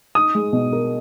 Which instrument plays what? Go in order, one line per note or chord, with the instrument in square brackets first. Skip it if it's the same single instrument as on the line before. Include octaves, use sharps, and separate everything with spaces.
[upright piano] D#4 [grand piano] D#6
[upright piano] G#3
B2
A#4